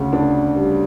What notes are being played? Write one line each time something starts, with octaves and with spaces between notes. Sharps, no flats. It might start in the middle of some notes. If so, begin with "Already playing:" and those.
Already playing: D2 C#3
D4
G3